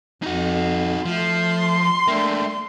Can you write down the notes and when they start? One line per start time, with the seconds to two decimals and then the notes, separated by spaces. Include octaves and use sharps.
0.22 F2 D#4 F#4
1.05 F3 A3 C6
2.08 A3 A#3 D4 E5 G5